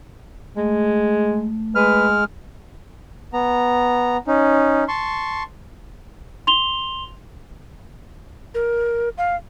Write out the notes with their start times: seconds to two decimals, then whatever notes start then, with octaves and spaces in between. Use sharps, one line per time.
0.57 G#3 A3
1.75 G#3 B4 F6
3.33 B3 A#5
4.27 C#4 D#4
4.88 A5 C6 C#6
6.47 C6 F7 G7
8.55 A#4
9.18 F5